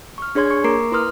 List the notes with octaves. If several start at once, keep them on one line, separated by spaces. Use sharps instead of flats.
C#6 F6
D4 G#4 C#5 C6 G#6
C#6 C#7
A#3 A#4 A#5 D6 C7 D7
E4 B4 C6 D#6 F6